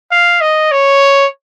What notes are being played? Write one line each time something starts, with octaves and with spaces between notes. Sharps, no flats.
F5
D#5
C#5